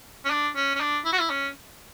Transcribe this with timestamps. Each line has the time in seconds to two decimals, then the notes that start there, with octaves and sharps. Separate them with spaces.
0.25 C#4
0.30 D4
0.56 C#4
0.75 C#4
0.81 D4
1.05 E4
1.13 F#4
1.20 E4
1.30 C#4